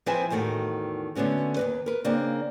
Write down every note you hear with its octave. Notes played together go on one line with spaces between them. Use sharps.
F3 C4 E4 B4 E5 G#5
E2 A2 D#3 A3 F#4
D3 A3 B3 C#4 F#4
D#2 C3 B4
A#4 B4
C#3 A#3 C4 D4